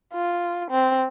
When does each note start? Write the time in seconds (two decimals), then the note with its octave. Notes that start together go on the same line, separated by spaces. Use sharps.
0.13 F4
0.71 C4